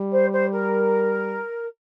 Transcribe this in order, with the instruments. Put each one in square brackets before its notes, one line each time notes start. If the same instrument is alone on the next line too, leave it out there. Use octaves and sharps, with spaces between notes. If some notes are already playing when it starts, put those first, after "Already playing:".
Already playing: [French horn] G3
[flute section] C5
C5
A#4